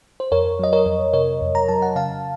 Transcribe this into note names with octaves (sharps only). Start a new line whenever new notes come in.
C5
F2 A#4 C#5
F#3 D#5
A#4 C#5
F2
C3 A#4 C#5
F2
A#5
F#3 A5
F#5
C#3 F5 A5